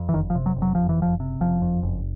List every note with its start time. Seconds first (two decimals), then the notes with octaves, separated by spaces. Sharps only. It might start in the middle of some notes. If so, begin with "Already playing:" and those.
Already playing: F2
0.09 E3
0.14 F#1 D#3
0.30 F3
0.35 C3
0.46 F#3
0.57 F#1
0.62 F#3
0.75 F2 F3
0.89 E3
0.98 F#1 F3
1.20 C3
1.40 F#1 F3
1.62 F2
1.83 F#1